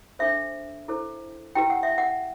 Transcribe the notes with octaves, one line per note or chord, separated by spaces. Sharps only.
D4 A4 C5 E5
E4 A4 C5
E4 G4 B4 G5
F#5
E5
F#5